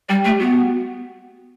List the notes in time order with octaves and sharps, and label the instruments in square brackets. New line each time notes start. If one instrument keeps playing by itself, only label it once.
[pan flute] G3 [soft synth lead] G4
[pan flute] A3
[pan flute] B3 [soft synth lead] F#4